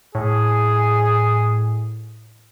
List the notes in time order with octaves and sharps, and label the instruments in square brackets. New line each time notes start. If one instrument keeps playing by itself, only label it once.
[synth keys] A2 [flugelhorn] G#4